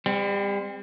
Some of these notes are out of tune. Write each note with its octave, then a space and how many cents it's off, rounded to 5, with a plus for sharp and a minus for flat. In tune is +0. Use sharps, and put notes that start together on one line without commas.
G3 +35 C4 -20